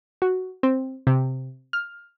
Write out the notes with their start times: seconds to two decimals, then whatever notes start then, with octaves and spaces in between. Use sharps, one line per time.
0.22 F#4
0.63 C4
1.07 C3
1.73 F6